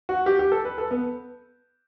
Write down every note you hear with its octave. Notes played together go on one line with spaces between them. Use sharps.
F#4
G4
G4
A4
B4
A4
B3